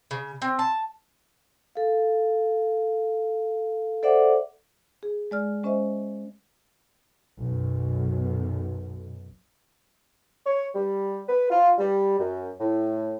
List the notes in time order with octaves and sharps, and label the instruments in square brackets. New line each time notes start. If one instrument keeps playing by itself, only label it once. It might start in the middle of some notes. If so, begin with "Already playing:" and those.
[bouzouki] C#3
C4
A5
[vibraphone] A4 F5
A4 C5 D5 E5 F#5 D6
[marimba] G#4
G#3 D5 F6
G#3 C#4 C5 D#5 E5
[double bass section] B1 F#2
[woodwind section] C#5
G3
B4
F4
G3
F#2
A2